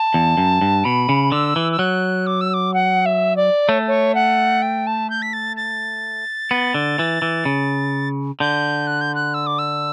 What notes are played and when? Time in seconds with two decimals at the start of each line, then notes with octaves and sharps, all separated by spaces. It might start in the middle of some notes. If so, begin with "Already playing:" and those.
Already playing: A5
0.14 E2
0.37 F#2
0.61 G2
0.85 B2 B5
1.09 C#3
1.32 D3 E6
1.56 E3
1.72 E6
1.79 F#3 F#6
2.27 D6
2.41 E6
2.54 D6
2.74 F#5
3.06 E5
3.36 D5
3.69 A3 C#5
3.88 C#5
4.15 F#5
4.62 G5
4.87 A5
5.10 G6
5.22 B6
5.33 A6
5.56 A6
6.51 B3
6.74 D3
6.99 E3
7.22 E3
7.45 C#3
8.40 D3 G6
8.87 F#6
9.01 G6
9.15 F#6
9.34 E6
9.47 D6
9.58 E6